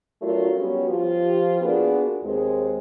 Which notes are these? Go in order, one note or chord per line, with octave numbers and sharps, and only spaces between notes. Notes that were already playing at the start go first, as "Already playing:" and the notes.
F#3 A3 D4 F4 F#4 A#4
F#3 G3 B3 C#4 F#4 G4
F3 F4 G4
A#3 B3 D4 F4 F#4 G#4
D#2 G#3 C4